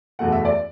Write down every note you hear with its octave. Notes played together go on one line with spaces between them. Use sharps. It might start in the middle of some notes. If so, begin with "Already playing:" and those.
F#1 E2 B2 A3 F#5
E5
D5